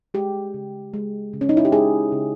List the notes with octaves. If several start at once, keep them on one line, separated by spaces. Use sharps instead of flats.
G#3 G4
C#3
G#3
C#3
C#4
D#4
E4
G4
G#3 G#4
C#3